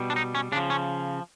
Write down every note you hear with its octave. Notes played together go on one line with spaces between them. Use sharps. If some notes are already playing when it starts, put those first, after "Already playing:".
Already playing: B2 G3
D4
D#4
C#4
C#3 F3 D4
C#4